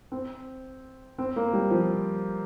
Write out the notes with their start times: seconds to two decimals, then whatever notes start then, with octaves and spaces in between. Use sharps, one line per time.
0.12 C4
1.18 C4
1.36 A#3
1.53 G3
1.70 F3